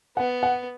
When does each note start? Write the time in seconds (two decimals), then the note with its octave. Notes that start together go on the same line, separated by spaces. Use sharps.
0.17 B3 F#5
0.43 F#5